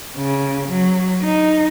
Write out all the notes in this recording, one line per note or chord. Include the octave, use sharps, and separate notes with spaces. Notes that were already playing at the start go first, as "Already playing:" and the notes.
C#3
F#3
D#4